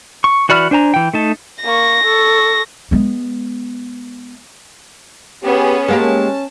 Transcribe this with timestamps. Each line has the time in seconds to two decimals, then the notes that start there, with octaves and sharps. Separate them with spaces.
0.24 C#6
0.49 E3 F#4 D5 B5 F6
0.71 D4 C5 G#5 A#5
0.94 E3 G5
1.14 A3 D#4 A5
1.64 A#3 C#6 A#6
2.04 A4 C#6
2.91 G#3 B3
5.44 B3 C#4 G4 G#4
5.88 G#3 A#3 C#4 G4 A5